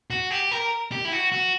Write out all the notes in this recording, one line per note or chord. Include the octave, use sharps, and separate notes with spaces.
F#4
G4
A#4
G4
E4
F#4
F#4